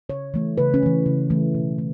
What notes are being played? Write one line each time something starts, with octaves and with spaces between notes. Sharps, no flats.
C#3 C#5
E3 A3
C#3 B4
C#4
E3 A3
C#3
E3 A3
B2
A3